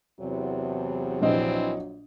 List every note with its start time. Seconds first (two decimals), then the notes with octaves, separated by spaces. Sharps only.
0.20 E2 C3 F#3
1.22 A#1 E3 C4 D4 D#5